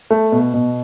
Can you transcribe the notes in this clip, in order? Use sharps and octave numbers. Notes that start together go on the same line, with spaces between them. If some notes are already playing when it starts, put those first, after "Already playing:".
A3
B2
B2